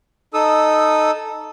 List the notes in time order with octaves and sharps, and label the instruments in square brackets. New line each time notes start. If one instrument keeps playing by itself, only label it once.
[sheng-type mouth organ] D#4 A4 D#6 E6